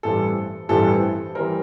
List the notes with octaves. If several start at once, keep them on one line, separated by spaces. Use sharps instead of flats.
A1 G2 E3 G3 C4 A4
A1 G2 E3 G3 C4 A4
E3 G3 C4 A#4